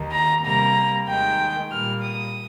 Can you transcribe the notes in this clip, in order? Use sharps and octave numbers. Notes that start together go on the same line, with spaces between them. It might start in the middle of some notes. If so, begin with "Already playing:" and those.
Already playing: D#2 D#3 A#3
A#5
C3 G3 A#3 A#5
D#2 D#3 G#3 G5
A#2 G3 A#3 F6
D#6